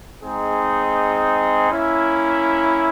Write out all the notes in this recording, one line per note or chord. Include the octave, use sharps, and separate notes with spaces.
G#3 C4 D#4 G#4
A#3 C#4 E4